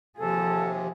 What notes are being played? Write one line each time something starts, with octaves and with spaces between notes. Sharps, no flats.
D#2 C3 F3 G#4 A4